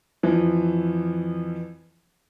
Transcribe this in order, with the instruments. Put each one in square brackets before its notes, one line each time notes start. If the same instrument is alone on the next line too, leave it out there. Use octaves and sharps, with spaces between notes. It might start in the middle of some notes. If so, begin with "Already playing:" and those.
[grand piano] F2 E3 F3